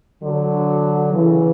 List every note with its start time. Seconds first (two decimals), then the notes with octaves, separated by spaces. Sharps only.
0.22 D3 F#3
1.13 C#3 E3